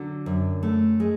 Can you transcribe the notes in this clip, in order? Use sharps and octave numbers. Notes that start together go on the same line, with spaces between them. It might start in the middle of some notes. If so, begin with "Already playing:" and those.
Already playing: D3 F#3
F#2
A3
G#3